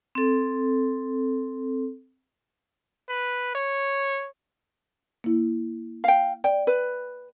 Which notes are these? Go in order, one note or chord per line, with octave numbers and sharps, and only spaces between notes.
C4 A4
B4
C#5
A#3 E4
F5 G5
D5 G5
B4